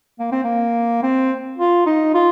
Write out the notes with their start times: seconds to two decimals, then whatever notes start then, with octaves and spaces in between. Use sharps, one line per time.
0.19 A#3
0.32 C4
0.44 A#3
1.03 C4
1.58 F4
1.86 D#4
2.14 F4